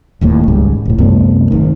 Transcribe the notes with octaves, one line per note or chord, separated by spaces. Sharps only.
D#1 D#2 A2 A#3
G#1 C#2 G#2 G3
D#1 A2
C2 F#2 A3 B3
G#1 D#3